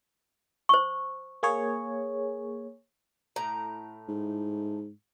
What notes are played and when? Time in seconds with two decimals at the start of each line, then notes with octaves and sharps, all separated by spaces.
0.69 C5 C#6
1.43 A#3 G#4 C#5
3.36 A2 A#5
4.08 G#2